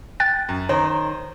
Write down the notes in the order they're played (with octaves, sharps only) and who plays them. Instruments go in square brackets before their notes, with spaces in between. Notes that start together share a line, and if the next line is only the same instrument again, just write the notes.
[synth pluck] G5 F#6 A6
[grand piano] F#2
[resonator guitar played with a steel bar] D#3 [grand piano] C5 [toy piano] C#5 A#5